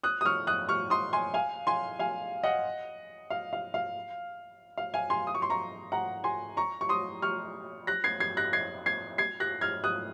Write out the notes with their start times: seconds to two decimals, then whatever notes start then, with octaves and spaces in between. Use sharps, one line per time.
0.04 D#6 F#6
0.21 D#6
0.25 C#6 F6
0.47 D#6 F#6
0.69 C#6 F6
0.90 C6 D#6
1.13 G#5 C6
1.34 F5 G#5
1.67 G#5 C6
1.99 F5 G#5
2.43 D#5 F#5
3.30 F5
3.53 F5
3.74 F5
4.77 F5
4.94 F5 G#5
5.10 G#5 C6
5.27 D#6
5.35 C#6
5.42 C6
5.50 A#5 C#6
5.92 F#5 A#5
6.24 G#5 C6
6.57 A#5 C#6
6.81 C#6
6.89 C6 D#6
7.22 C#6 F6
7.87 F#6 A#6
8.04 G#6 C7
8.20 G#6 C7
8.37 F#6 A#6
8.53 G#6 C7
8.86 G#6 C7
9.18 G#6 C7
9.40 F#6 A#6
9.61 F6 G#6
9.84 D#6 F#6